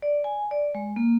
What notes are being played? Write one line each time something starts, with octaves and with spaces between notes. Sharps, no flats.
D5
G#5
D5
G#3
A#3